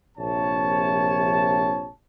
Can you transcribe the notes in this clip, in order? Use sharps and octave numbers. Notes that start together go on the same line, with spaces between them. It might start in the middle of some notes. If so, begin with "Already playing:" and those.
A#1 C3 C#5 A5